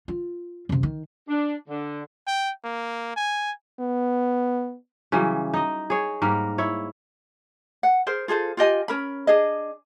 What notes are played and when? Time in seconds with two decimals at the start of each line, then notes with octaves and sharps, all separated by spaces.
0.08 F4
0.69 F#2 C3
0.83 D#3
1.28 D4
1.68 D3
2.27 G5
2.64 A#3
3.16 G#5
3.80 B3
5.12 C#3 E3 F#3 G3
5.54 D#4 D#5
5.90 G#4 C#5
6.22 G#2 G3 A#3 A#4
6.58 E4 C#5
7.83 F#5
8.07 G#4 A#4 C5
8.28 F4 G#4 A4 C5
8.57 F4 G4 D#5 G#5
8.88 C#4 A#4 B5
9.27 D4 G#4 D#5